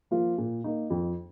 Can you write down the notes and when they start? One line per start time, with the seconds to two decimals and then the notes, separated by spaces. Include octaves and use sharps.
0.11 F3 A#3 F4
0.38 A#2
0.64 A#3 D#4
0.90 F2